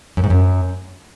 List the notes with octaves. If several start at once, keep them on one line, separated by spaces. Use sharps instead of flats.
F#2
G#2
F#2